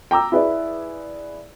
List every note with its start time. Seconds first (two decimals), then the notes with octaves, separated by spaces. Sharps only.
0.11 G5 A#5 D6 E6
0.32 E4 G#4 B4 D5